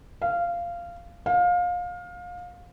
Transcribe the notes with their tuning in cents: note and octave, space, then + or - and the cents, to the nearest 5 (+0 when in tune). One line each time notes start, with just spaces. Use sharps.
F5 -15
F5 +25